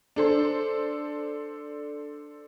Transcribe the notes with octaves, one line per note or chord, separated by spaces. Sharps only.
D4 A4 C5